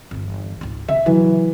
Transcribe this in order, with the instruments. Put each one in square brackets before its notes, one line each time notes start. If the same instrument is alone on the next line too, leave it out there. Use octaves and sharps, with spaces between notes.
[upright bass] G1 E2
C#2 G#2
[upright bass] C#3 [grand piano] E5
[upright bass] C#3 F#3 [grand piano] E3